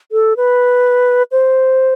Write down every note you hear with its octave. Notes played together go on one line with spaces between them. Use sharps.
A4
B4
C5